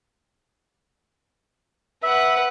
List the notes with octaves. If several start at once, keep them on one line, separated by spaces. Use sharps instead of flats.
B4 E5 F#5